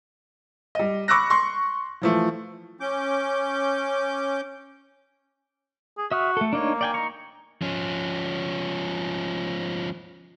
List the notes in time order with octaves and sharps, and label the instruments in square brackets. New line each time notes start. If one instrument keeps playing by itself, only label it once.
[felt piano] G3 D#5
B5 C#6 D6 E6 F#6 A#6
C6 C#6
E3 F3 A3
[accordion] C#4 D6 G6
[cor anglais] G#4
[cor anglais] F#4 [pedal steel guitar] E5 D#6 F6
[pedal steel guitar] A3 A4
[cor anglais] A#3 [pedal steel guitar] D4 D#4 C#5
[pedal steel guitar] D5 G5 G#5
D#4 A#5 C#6
[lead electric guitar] F3 C#4